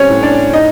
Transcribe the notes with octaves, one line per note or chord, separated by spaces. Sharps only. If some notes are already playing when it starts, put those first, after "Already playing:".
Already playing: G3 C4 C#4 C#5
A2
D4 D5
D#4 D#5